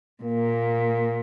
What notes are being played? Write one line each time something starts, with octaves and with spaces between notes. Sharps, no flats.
A#2 A#3